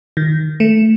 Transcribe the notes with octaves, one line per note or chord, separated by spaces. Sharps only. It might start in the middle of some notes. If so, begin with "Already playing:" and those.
D#3
A3